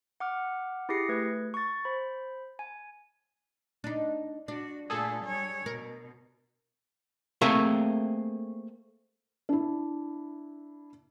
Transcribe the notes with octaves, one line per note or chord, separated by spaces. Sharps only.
F#5 D6 F6
E4 G4 G#4 A#6 C7 C#7
A3 B4 G#6
C#6 A6
C5 B5
G#5
D4 D#4
D4 F#4
A#2 A3 G#4 A4
G3 C#5
B2 A#4
A3 A#3 C4 G#4 A#4 E5
D4 E4